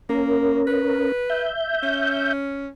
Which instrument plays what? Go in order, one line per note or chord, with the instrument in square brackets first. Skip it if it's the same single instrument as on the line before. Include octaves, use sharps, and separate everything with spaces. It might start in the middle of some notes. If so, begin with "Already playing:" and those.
[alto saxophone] A#3 [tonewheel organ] C#4 A#4
[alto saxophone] B4
[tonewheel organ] E5 G6
[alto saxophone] C#4